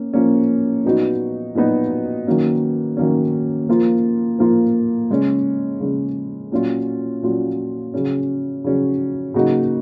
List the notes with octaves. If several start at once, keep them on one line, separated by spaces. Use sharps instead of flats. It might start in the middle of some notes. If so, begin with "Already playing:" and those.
Already playing: A#3 C#4
F3 A#3 C#4
A#2 F#3 B3 D#4 F#4
A#2 F#3 B3 D#4 F#4
D#3 F#3 A#3 C#4
D#3 F#3 A#3 C#4
F3 A#3 F4
F3 A#3 F4
C#3 G#3 C#4
C#3 G#3 C#4
A#2 F#3 C#4 F4
A#2 F#3 C#4 F4
C#3 F#3 C#4
C#3 F#3 C#4
C#3 F#3 A#3 D#4 F#4